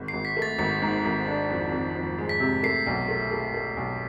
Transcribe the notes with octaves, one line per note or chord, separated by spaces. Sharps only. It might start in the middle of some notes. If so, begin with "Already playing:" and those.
Already playing: G#1
C7
G#1
B6
A3
A6
G#1 A6
G#2
G#1
D4
F2
F2
F2
G#3
B6
C3
A3 C7
B1
A3
A3
A3
B1